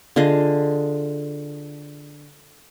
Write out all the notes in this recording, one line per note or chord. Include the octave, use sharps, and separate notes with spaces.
D3 F4 G#4 D#5